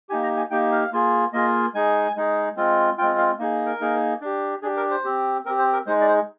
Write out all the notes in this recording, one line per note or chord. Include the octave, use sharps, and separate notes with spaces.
A#3 D#4 G4 G#5
A#5
G#5
A#3 D#4 G4 G5
F5
A#3 F4 G#4
A#3 F4 G#4 D#5
G#3 D#4 G#4 G#5
G#3 D#4 G#4
G#3 C4 F4
G#3 C4 F4 G5
F5
A#3 D#4 G#4
A#4
A#3 D#4 G#4
D4 G4
D4 G4 G#4
A#4
C5
C4 G4
C4 G4 A#4
C5
A#4
G#3 D#4 G#4 C5
D5
C5